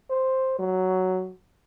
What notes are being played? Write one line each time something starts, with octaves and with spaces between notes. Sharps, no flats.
C5
F#3